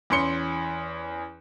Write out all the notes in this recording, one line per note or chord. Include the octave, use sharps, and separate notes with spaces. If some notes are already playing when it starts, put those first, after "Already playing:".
E2 E3 C#4 C6 C#7 G7